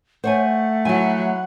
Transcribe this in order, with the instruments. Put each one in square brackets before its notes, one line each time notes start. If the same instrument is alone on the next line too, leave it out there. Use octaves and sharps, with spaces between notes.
[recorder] A3 [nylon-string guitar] C5 C#5 G#5 [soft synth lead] F#5
[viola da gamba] F#3 [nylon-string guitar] E4 G#5